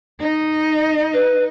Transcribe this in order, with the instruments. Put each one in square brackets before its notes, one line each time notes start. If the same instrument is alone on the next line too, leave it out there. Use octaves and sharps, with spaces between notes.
[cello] D#4 D#5
[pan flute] B4